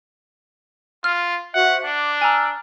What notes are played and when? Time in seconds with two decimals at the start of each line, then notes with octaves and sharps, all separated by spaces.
1.04 F4 F6
1.54 F#4 C5 E5 F#5
1.85 D4 D6
2.21 G#5 A#5 E6 F6